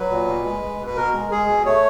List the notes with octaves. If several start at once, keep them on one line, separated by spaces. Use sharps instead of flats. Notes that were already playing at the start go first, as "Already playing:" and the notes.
Already playing: F#3 B4
A#2
B2
G#3
G#3
B2
B4
B2 A#4
G#3
G#3 G#4
B2
A3 C#5